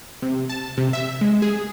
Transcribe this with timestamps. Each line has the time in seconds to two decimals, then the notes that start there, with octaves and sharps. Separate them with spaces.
0.22 C3
0.49 A5
0.78 C3
0.93 E5
1.21 G#3
1.42 G#4